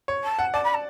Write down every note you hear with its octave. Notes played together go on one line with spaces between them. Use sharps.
C#5
A5
F#5
D5 A5
B5
A5